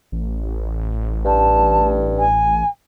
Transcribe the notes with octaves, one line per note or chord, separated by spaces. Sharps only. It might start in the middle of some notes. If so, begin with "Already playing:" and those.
A1
G2 A5
G#5